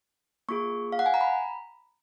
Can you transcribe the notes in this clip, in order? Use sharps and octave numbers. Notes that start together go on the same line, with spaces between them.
A#3 F4 G#4 C#6
F5
F#5
G#5
A#5
B5